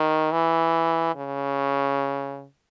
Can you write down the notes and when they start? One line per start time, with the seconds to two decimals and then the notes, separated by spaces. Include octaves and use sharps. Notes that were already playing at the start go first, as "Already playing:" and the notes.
Already playing: D#3
0.32 E3
1.16 C#3